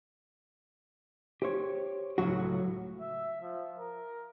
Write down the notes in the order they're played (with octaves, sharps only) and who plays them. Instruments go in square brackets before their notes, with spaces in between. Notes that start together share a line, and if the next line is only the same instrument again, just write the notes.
[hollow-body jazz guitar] G4 C5 C#5
C#2 A2 D#3 F#3 F#4
[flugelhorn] E5
F3
A#4